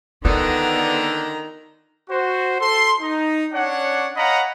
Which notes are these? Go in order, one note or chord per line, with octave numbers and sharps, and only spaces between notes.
D3 D#3 B3 F4 A#5
F#4 C5
A4 C6
D#4
C#4 D4 C#5 D5 F#5
C#5 D#5 F5 F#5 A#5 B5